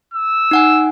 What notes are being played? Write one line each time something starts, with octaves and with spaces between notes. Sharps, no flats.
E6
D#4 F#5 G#5